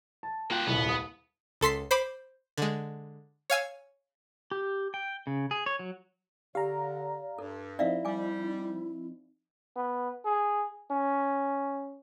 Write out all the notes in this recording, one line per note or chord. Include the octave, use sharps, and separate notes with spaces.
A5
A#3 F4 F#5 G5
D#1 C2 B3
D#6
C#2 A4 C6 B6 C7
C5 B5 D6
D3 G#3
C#5 F5 G#5 E6
G4
G5
C#3
G#4
C#5
F#3
D3 G4 D5 F5 A#5
G2 A4
F3 C4 D#4 E4 D5 E5 F5
G3 G#5 D6
B3
G#4
C#4